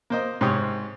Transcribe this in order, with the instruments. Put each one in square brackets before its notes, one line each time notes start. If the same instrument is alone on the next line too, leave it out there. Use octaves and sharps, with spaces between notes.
[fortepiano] A#3 C5 D#5
G#2 C3 G4 C#5 G5 D#6